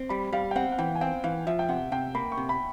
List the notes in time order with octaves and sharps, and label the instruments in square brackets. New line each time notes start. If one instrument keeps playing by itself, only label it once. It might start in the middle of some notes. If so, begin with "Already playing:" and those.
Already playing: [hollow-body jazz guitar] C4
[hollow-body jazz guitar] G3 [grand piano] B5
[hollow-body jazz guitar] G3 [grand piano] F5
[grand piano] G5
[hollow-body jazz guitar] C4 [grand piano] F#5
[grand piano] F#5
[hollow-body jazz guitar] E3 [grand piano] G5
[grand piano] G#5
[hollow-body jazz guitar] C4 [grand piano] G5
[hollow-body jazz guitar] E3 [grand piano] F5
[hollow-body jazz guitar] F3 [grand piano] E5
[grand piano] G5
[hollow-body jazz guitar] C3 [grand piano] F#5
[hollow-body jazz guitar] C3 [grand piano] G5
[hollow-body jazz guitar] A#3 [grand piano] B5
[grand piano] C#6
[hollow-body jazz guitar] C3
[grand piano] B5